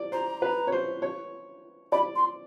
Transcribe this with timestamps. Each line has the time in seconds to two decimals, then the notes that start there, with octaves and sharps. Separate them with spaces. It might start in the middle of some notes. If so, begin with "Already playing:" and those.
Already playing: D5
0.12 C5 A#5
0.42 B4
0.67 C#5
0.72 C5
1.02 C#5
1.92 D5 B5
2.15 C6